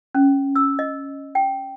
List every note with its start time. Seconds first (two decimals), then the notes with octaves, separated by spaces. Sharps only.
0.15 C#4
0.55 E6
0.79 D#5
1.35 G5